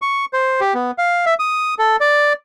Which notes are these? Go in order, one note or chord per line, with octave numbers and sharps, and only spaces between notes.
C#6
C5
G4
B3
F5
E5
D#6
A4
D5